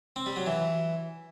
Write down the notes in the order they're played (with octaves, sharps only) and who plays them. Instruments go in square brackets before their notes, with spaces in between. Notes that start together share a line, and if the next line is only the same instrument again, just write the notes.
[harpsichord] C4
G3
F#3
E3